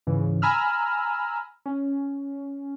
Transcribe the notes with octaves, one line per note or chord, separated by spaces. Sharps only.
G#2 C#3 E3
G#5 A#5 B5 E6 F6
C#4